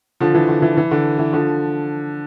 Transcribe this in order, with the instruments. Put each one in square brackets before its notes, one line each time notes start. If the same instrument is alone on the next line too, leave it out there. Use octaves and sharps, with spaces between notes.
[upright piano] D3 F3
E3
D3
E3
E3
D3
E3
D3 F3